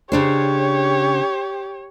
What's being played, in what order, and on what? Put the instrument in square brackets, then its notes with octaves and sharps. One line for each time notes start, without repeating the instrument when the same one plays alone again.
[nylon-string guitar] C#3 D4 C5 [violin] G4 [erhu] C#5